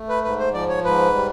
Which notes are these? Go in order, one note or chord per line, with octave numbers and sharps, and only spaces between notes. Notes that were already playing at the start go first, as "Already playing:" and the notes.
Already playing: A3
B4
G#2 B4
C5
F3 D5
C#5
G#2 B4
G3